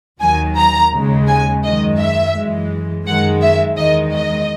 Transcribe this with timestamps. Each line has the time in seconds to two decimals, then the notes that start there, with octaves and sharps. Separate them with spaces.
0.21 D#2 D#3 F#3 G#5
0.57 A#5
0.92 D#2 C#3 G#3
1.27 G#5
1.63 F#2 D#3 G#3 D#5
1.99 E5
2.34 F#2 E3 G#3
3.06 F#2 D#3 G#3 F#5
3.42 E5
3.78 E2 D#3 G#3 D#5
4.14 D#5